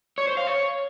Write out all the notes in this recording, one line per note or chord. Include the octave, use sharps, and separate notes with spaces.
C#5
C5
F5
C#5